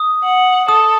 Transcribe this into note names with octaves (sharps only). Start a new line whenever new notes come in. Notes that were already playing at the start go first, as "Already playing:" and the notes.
Already playing: D#6
F#5
A4 D#6